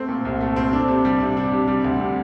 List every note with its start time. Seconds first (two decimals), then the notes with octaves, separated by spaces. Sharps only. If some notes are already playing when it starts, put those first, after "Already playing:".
Already playing: A3 C4
0.08 A#2
0.25 C2
0.41 A3
0.56 C4
0.73 D4
0.88 C3
1.05 G3
1.20 C3
1.37 D4
1.52 C3
1.68 G3
1.84 D2
2.00 C3